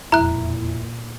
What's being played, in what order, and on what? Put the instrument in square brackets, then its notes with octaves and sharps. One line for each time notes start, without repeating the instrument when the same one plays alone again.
[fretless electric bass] E1 F2 [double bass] A#2 [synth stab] E4 [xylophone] A#5 F#6